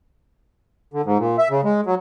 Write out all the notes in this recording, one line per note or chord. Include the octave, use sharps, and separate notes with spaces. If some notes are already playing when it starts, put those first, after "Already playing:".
D3
G#2
A#2
E5
C#3
G#3
F#3